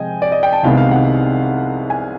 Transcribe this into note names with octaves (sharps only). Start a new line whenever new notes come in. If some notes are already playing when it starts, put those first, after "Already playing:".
Already playing: C3 F3 G#3 D#5 G5 G#5
D5
D#5
G5
A5
C2 C3 D#3 G#3 B3 F5
F5
F#5
G#5